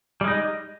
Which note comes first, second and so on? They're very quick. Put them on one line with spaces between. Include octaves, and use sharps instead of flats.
G3 G#3 D#4